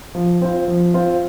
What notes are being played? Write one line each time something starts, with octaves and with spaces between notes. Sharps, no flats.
F3
C4 F4
F3
C4 F4